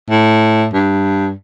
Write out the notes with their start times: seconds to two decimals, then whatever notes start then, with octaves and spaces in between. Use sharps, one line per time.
0.10 A2
0.74 G2